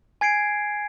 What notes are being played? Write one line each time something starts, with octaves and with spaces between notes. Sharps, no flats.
G#5 G#6 C7 D7